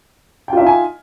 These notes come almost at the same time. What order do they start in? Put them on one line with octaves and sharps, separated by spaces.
G5 F4 E5 D#4 G#5